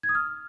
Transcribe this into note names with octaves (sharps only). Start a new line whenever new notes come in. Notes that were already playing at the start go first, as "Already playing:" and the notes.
G#6
D#6
F6